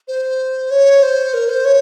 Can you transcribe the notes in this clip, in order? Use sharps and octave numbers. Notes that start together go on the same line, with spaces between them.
C5
C#5
C5
A#4
C5
C#5